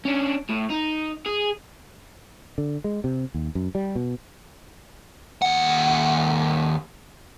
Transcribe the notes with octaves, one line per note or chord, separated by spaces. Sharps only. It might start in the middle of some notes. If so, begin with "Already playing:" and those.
C#4 D4
A2
D#4
G#4
D3
G#3
C3
D#2
F#2
G3
B2
D#2 F#5